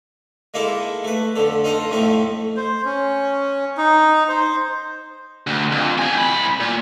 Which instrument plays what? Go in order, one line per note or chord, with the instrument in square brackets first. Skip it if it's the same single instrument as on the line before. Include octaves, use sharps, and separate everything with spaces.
[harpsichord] G#3 A#3 D#4 E4 A4
A3 B4
F2 D3 A4
D#4 F4 A4 D#5
F2 A2 F3 A3 D#4
[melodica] C5
C#4
D#4
C5
[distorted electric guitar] D2
F2
G4 G#5
C2 B5
A#2